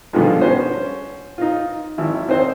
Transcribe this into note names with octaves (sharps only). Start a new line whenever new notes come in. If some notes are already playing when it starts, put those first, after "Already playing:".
G2 B2 D3 D#3 F3 G#3
C#4 F#4 B4 C5
D#4 F4
G#1 E4
C4 D#4 C5